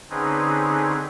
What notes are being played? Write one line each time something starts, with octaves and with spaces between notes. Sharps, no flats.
D3 C4 C#4 D#4 G#4 B4